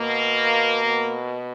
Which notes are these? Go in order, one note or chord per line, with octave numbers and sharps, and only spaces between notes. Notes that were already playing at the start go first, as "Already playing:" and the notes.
Already playing: B2 A#3
B2